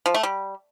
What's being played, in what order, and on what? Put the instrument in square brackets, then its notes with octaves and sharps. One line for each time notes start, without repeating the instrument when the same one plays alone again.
[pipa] F3
A3
G3